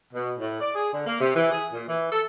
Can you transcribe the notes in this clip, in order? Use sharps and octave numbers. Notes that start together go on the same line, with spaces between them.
B2
A2
D5
G#4
D3
A#3
C3
E3
G#4
A#2
E3
A4